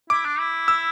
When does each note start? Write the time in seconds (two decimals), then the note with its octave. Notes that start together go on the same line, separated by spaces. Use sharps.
0.10 E4 D6
0.25 D4
0.39 E4
0.68 E6